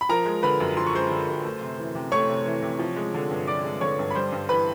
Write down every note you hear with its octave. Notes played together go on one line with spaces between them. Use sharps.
B5
F3 A#4 A#5
G#3
D3 B4 B5
F#2
F3 C6
C#6
G#3 C5 C6
D3
F#2
A3
C3
E3
C3
A3 C#5 C#6
C3
E3
C3
F3
G#3
D3
G2
F3 D5 D6
G#3
D3 C#5 C#6
G2
B5
G3 C5 C6
G2
E3 B4 B5